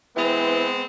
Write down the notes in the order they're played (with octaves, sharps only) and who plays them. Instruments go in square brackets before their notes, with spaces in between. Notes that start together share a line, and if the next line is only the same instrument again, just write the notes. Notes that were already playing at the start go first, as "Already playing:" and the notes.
[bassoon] E3 [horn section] G#3 B3 C4